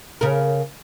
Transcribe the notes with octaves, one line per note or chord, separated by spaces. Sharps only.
C#3 A#4